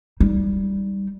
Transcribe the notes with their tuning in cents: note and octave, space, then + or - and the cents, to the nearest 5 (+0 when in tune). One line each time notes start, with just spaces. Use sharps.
G3 +0 D#4 +0